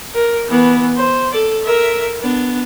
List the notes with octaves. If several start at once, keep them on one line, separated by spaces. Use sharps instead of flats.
A#4
E3 B3
C5
A4 D5
A#4 E5
B3 D4